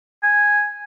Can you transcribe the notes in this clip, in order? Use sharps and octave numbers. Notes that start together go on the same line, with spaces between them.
G#5